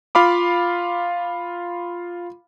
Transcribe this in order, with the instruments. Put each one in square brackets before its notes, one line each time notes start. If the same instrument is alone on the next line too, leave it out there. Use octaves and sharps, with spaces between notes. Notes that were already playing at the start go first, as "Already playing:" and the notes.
[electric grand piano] F4 F5 B5 D6